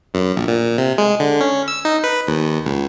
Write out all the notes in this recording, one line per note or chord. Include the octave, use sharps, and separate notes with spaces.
F#2
A#1
A#2
C3
G#3
D3
C#4
E6
D#4
B4
D#2
C#2